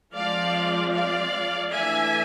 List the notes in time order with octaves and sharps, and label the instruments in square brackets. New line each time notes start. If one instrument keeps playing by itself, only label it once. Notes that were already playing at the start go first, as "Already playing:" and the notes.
[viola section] F3 G#3 C4 D5 F5
D5 F5
E3 A3 D4 E5 G#5